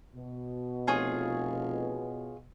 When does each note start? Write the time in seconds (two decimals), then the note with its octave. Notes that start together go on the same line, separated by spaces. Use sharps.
0.15 B2
0.87 F1 F4 G#4 C#5